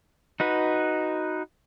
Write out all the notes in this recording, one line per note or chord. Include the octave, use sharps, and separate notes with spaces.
D#4 F#4 B4